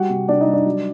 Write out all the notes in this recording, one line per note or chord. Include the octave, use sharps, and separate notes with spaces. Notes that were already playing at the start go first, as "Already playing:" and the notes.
Already playing: G3 F#4 F#5
C3
C3 D4 D5
D#4 D#5
G3
D4 D5
F#3